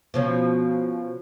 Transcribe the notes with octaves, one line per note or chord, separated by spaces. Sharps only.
B2 F3 C#4